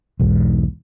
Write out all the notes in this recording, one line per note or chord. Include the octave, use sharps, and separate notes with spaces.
B1 E2 G#2